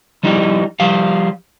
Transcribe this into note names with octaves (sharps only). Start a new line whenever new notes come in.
F3 G3 D#4 E4
F3 G3 F5